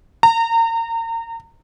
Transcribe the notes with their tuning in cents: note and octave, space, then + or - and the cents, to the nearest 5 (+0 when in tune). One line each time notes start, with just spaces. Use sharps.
A#5 -30